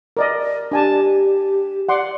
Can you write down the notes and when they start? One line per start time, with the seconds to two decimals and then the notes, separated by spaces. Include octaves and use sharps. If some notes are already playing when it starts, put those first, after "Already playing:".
0.17 A#4 D5 D#5
0.72 D4 G4 G#5 A5
1.89 D5 F#5 C6 D6